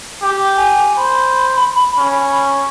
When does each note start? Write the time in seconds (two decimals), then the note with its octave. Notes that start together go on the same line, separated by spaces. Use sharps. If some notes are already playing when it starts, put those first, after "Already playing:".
0.23 G4
0.57 G#5
0.97 C5 B5
1.98 C#4